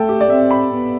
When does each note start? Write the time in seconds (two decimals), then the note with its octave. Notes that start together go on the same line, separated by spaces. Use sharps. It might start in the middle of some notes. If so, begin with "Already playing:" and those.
Already playing: A3 A4 G5
0.09 G4
0.21 D5
0.30 C4 E5
0.51 B5
0.71 B3